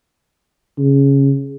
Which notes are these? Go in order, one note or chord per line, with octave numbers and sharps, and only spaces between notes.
C#3